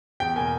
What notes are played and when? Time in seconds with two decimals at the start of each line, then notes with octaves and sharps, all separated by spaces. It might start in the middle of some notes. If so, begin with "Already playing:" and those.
0.20 E2 G5
0.36 B2 A#3 G#5